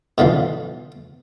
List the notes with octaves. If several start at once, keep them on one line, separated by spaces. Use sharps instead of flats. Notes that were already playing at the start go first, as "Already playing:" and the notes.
B2 D3 E3 F3